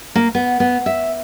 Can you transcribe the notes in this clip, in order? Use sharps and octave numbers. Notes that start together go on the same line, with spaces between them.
A#3
B3
B3
E5